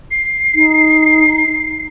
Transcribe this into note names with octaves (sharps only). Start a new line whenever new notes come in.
C7
D#4